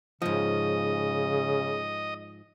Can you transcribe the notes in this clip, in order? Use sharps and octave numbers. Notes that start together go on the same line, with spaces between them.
G#2 C#3 F3 D#5